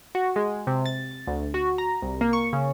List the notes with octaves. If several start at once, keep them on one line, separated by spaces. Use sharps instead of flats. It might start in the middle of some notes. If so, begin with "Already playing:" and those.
F#4
G#3
C3
A6
D2
F#4
A#5
C2
A#3
C#6
C#3